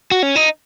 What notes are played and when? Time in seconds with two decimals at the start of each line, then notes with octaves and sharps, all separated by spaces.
0.11 F#4
0.23 C#4
0.36 D#4